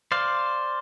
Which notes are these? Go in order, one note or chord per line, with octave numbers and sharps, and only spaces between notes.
C5 D5 F5